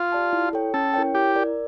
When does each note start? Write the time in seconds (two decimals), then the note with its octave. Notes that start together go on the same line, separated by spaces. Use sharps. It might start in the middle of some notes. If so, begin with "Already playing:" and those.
Already playing: F4
0.12 G4 D5 A5
0.33 E4
0.53 A4 C#5 G5
0.74 C#4 A4
0.94 E4 A#4 C#5 G5
1.14 E4 G4
1.36 A#4 D5